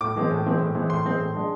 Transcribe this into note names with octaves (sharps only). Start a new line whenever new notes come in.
A2 D6
E3 G#3 C4
A2
E3 G#3 C4
A2
E3 G#3 C4
A2 C6
E3 G#3 C4
A2
G#3 D4